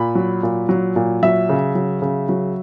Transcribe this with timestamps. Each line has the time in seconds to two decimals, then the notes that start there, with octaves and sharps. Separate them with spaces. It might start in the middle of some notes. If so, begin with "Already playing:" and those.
Already playing: A#2 B5
0.15 F#3
0.43 A#2
0.69 F#3
0.96 A#2
1.23 F#3 E5
1.49 C#3
1.75 F#3
2.02 C#3
2.29 F#3